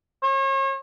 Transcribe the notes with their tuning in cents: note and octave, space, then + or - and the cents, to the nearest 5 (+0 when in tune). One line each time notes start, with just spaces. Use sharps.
C#5 -40